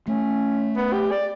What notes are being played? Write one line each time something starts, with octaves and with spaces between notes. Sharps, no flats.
A3 C#4
B3
G4
D5